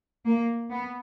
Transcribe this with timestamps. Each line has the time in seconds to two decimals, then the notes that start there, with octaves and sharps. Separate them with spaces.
0.25 A#3
0.70 B3